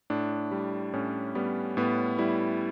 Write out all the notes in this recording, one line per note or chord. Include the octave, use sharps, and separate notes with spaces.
A2 D4
G3
A2 C#4
G3 B3
A2 B3
G3 E4